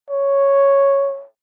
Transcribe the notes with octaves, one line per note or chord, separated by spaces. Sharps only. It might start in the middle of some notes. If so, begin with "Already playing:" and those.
C#5